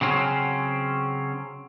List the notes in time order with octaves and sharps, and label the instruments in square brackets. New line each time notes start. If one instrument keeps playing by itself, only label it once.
[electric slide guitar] C#3 F#3 C4 C#4